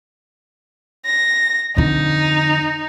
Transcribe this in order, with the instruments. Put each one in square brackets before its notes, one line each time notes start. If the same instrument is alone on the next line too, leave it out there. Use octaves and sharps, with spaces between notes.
[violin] A#6
[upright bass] F2 D3 [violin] D#4